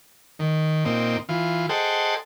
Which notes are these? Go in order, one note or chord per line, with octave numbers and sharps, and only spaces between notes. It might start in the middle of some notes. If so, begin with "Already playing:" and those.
D#3
A#2 C4 D#4
E3 F4
G#4 A4 C5 D#5 F#5 G5